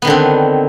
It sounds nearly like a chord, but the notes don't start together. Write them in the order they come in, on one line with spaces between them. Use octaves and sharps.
B3 D#3 D3 C4